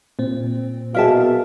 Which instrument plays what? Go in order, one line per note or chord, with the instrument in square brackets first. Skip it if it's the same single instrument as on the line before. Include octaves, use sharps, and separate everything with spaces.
[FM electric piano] A#2 C4
[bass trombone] B2 [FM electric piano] G#4 F5 [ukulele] A#4 E5 A5